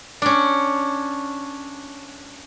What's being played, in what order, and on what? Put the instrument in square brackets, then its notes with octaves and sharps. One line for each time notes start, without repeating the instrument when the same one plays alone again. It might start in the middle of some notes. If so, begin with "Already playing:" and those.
[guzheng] C#4 D4